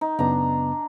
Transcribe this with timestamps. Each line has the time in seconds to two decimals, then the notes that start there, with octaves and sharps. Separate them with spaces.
0.01 D#4
0.19 F#2 C#3 B3 D4 A#5